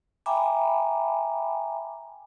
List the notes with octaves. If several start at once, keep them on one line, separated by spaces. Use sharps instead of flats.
E5 G5 G#5 A#5 B5 D6